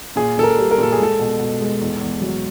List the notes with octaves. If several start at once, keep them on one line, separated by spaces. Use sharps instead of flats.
A#2 G#4
A#2 A4
A#4
G3
A#4
A#2 A4
G#4
G#3 A4
B2
B2
G#3
E2
E2
F#3